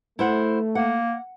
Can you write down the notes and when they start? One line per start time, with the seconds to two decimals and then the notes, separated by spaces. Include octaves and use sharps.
0.19 A3 E4 C5 F#5
0.75 A#3 F#5